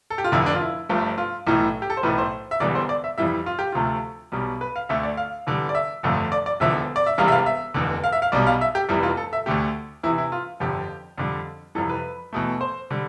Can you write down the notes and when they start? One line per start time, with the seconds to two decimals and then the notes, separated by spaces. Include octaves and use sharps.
0.10 A4
0.18 G4
0.24 F4
0.32 F1 F2 D3 E4
0.46 D4
0.55 F4
0.61 E4
0.89 G1 G2 F3 A3
1.18 F4
1.47 B1 A2 E3 A3
1.82 G4
1.90 A4
1.97 C5
2.03 B1 A2 E3 A3 B4
2.18 C5
2.51 E5
2.60 E1 E2 D3 G3 D5
2.75 C5
2.89 D5
3.04 E5
3.18 F2 E3 G3 E5
3.46 F4
3.59 G4
3.72 D2 C3 F3 A3 F4
4.32 B1 B2 G3
4.61 B4
4.76 F5
4.89 D2 D3 A3 E5
5.03 D5
5.17 F5
5.47 E2 D3 G3
5.69 D5
5.75 E5
6.03 G1 F2 D3 A3
6.32 D5
6.46 D5
6.60 E1 E2 D3 F3 E5
6.96 D5
7.06 E5
7.18 E1 E2 C3 G3 F5
7.28 E5
7.32 F5
7.46 E5
7.74 F1 E2 D3
8.04 F5
8.12 E5
8.22 F5
8.32 B1 B2 G3 D5
8.47 F5
8.61 E5
8.75 G4
8.89 F1 E2 C3 E3 G3 E4
9.03 F4
9.17 A4
9.33 E5
9.46 D2 D3 A3 G4
10.03 E2 C3 E3 E4
10.18 E4
10.32 F4
10.60 G1 F2 D3 G4
11.18 F2 D3 G3
11.75 F2 C3 E3 G3 A4
11.89 B4
12.33 E2 B2 A3
12.61 C5
12.91 D3 G3